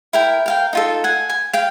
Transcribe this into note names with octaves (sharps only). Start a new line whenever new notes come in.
E4 A#4 G5
A#4 F5 G5
D#4 F4 A4
F#5 G#5
G#5
F5 G5